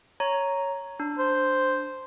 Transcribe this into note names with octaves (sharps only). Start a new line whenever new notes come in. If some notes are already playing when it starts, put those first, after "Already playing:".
C#5 A#5
D4
C5